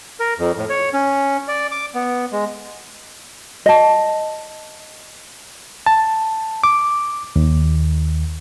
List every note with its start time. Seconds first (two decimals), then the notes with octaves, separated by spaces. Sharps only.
0.20 A#4
0.39 F2
0.58 A2
0.69 C#5
0.93 C#4
1.48 D5
1.71 D6
1.94 B3
2.32 G#3
3.66 D#5 A5
5.86 A5
6.64 D6
7.36 D#2